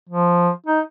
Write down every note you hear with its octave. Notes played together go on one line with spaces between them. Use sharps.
F3
D#4